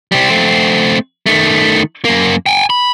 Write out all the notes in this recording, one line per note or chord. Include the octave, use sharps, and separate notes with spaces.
G3 C4
A3 C4
D#3 A3
F#2 A#3
G5 G#5
B5